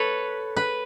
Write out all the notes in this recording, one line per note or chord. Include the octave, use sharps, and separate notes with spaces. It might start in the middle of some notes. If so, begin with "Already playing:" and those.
Already playing: A4 B4 C#5
B4